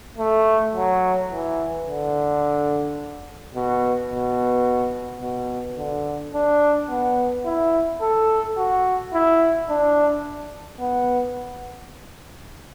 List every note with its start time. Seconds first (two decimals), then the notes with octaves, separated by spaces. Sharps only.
0.18 A3
0.74 F#3
1.30 E3
1.87 D3
3.55 B2
4.10 B2
5.21 B2
5.78 D3
6.34 D4
6.89 B3
7.45 E4
8.01 A4
8.58 F#4
9.13 E4
9.69 D4
10.80 B3